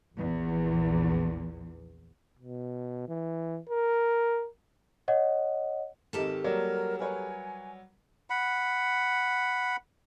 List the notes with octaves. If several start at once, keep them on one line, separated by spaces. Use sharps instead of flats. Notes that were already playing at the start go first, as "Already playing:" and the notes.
A#1 E2
B2
E3
A#4
C#5 D#5 F#5
G#1 D#3 G4 A4 A#4 A5
F#3 G3 A#3 A#4 D5
A#4 B4 C#5 G#5
F#5 B5